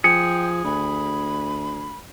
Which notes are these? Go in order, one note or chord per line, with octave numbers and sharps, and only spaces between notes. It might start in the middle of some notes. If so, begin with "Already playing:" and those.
F3 G#4 G5 C#7
D2 B5